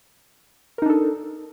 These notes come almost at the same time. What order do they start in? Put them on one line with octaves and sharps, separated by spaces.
A#4 D#4 D4 A4